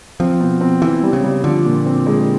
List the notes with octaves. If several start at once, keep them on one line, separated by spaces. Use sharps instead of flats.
F3 C4
B2
C4
B2 E3
G3
C#3
G3
D3 F3
A#2
C4
G#3